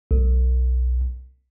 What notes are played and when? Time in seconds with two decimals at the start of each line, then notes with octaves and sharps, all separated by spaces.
0.11 B1